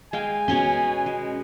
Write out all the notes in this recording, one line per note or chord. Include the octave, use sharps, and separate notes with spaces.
G#3 F5 G5 G#5
B2 C#4 C#5 C6
G#3